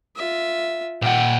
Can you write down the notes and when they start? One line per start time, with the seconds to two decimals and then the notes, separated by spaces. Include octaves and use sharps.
0.15 F4 E5
1.02 A#2 F#5 G5